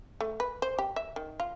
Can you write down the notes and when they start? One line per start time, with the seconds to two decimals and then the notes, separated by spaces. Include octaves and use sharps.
0.21 A3
0.40 B4
0.62 C5
0.79 G4
0.96 E5
1.16 D#3
1.40 F4